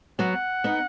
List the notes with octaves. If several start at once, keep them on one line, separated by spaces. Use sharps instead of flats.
F#3 B3 F#5
B3 D#4